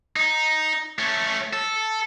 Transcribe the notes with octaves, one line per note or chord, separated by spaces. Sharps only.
D#4
A3 C#4
A4